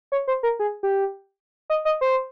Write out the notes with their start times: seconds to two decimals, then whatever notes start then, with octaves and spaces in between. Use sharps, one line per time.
0.12 C#5
0.28 C5
0.43 A#4
0.59 G#4
0.83 G4
1.70 D#5
1.85 D#5
2.01 C5